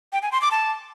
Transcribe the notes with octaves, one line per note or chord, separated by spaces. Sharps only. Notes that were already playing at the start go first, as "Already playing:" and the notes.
G5
G#5
C6
D6
A5